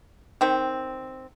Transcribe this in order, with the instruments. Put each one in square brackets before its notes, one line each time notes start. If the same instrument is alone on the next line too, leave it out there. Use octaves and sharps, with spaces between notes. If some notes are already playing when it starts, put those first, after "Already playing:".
[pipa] D#3 C4